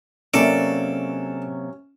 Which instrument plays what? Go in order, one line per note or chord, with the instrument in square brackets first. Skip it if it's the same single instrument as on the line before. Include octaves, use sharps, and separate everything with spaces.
[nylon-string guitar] C3 F#3 A#3 [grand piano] C#4 [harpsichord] A4 D5